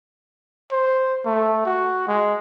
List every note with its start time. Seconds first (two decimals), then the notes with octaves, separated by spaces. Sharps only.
0.72 C5
1.26 A3
1.66 F#4
2.08 G#3